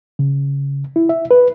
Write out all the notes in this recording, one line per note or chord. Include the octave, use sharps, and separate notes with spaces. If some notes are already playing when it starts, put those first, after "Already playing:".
C#3
E4
E5
B4